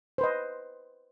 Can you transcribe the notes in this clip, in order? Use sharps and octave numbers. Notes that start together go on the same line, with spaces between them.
B4 C5 D#5